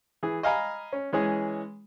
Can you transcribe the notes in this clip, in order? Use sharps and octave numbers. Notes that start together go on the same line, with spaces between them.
E3 G#4
D#5 F5 G#5 A#5 B5
C#4
E3 G#3 C#4 G#4